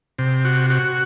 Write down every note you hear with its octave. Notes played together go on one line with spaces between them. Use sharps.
C3
F#4
F#4